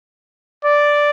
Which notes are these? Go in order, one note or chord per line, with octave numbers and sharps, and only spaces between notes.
D5